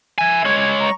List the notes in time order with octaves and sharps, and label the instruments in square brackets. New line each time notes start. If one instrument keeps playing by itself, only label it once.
[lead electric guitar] E5 G#5 [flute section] G#6
[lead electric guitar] G#3 C#5
[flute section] A#5 C#6